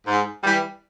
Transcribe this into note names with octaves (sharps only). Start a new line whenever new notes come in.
G#2
E3 G3